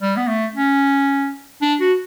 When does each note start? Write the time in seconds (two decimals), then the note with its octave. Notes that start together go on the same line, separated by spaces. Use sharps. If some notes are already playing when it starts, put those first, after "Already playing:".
0.01 G3
0.17 B3
0.28 A3
0.54 C#4
1.62 D4
1.81 F#4